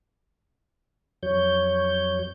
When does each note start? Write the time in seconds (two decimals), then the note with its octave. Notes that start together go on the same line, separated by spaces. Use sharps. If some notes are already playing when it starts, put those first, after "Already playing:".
1.23 F2 F#3 C#5 G6